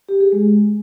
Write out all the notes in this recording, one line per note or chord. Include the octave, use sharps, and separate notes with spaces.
G4
G#4
G#3